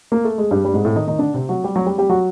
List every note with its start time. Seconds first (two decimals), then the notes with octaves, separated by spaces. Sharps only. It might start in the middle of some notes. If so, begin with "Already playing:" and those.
0.12 A#3
0.25 A3
0.38 G#3
0.51 G2 G3
0.65 G3
0.74 G#2 G#3
0.85 A2 A3
0.96 D#3 D#4
1.07 D#3 D#4
1.19 D3 D4
1.34 C3 C4
1.49 F#3 F#4
1.64 G3 G4
1.76 F#3 F#4
1.86 G3 G4
1.98 G3 G4
2.09 F#3 F#4